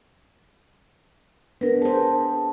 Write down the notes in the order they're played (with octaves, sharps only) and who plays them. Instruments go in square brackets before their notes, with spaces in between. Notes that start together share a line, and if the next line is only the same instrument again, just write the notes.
[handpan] B3 D4 [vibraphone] A#4 B4
[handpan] G#4 C5 [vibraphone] A5